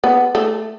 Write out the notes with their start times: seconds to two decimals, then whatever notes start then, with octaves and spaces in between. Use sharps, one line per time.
0.04 B3
0.35 A3